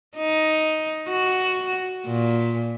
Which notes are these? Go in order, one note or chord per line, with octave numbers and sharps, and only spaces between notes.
D#4
F#4
A#2